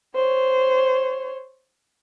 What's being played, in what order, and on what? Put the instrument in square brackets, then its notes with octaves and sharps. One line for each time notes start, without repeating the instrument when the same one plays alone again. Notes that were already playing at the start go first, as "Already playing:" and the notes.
[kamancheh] C5 C#5